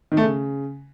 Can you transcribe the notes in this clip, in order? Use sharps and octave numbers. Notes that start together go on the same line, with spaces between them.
D#3
A3
C#3